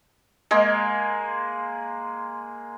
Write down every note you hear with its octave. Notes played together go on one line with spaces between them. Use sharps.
G#3 A#3